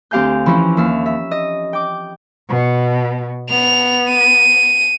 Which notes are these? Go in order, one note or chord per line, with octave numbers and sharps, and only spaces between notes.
D2 C4 G4 F5 G#5 G6
E3 F3 C#4 E4 F4
D#2 E5 F5
E5
D#5
G5 D6
B2
B3 F7
D#7